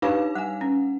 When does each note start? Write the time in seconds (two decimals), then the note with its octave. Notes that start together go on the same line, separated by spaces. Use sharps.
0.02 D4 D#4 G4 B4 F5 C#6
0.35 G3 F#5 G#5
0.61 C#4